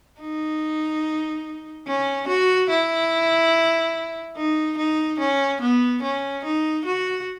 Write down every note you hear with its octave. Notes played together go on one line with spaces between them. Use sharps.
D#4
C#4
F#4
E4
D#4
D#4
C#4
B3
C#4
D#4
F#4